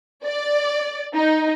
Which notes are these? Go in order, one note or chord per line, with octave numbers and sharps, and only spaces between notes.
D5
D#4